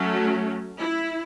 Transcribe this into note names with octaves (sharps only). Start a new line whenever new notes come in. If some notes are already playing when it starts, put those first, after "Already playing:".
Already playing: F#3 A3 C#4
E4